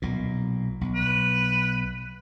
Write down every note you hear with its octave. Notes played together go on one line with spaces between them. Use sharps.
B1 A#2
B1
B4